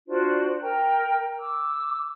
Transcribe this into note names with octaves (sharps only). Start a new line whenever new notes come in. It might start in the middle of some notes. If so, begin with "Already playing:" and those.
D4 F4 F#4 C5
A#4 G5 A#5
D6 E6